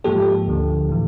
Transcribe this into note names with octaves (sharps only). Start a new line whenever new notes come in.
G#2 F3 A#3 G4 A4
D2 D3 F3
A2 E3